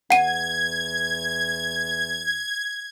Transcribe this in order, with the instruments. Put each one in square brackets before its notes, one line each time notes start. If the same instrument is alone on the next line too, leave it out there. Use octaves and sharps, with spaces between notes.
[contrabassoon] E2 [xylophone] F#5 D#7 [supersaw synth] G#6